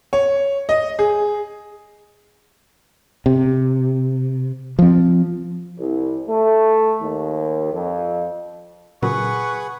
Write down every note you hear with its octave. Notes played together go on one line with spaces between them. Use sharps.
C#5
D#5
G#4
C3
F3 C4
C2
A3
D#2
F2
A#2 C#3 F#3 G#4 B4 F#5 C#6